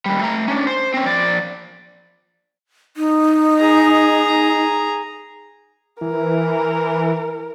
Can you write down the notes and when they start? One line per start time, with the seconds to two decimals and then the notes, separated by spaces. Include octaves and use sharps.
0.06 D#2 G3
0.21 A3 A#5
0.48 C#4 D4
0.67 C5
0.94 C4 C#4
1.06 F3 D5
2.97 D#4
3.59 G#4 A#5
6.01 E3 A#4